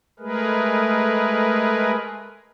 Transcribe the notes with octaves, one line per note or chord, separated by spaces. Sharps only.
G#3 A3 G#4 A#4 B4